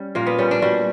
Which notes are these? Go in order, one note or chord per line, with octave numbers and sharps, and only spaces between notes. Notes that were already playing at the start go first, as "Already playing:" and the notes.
Already playing: G3 C#4
A#2 A#3
B3
G3 C#4
D4
G3 F#4